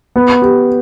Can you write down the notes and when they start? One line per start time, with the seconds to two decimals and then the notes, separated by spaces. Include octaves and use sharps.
0.16 B3
0.42 G4